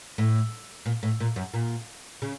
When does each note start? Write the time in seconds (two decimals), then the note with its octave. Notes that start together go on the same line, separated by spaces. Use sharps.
0.18 A2
0.86 A#2
1.03 A2
1.20 A#2
1.36 F#2
1.54 A#2
2.22 C#3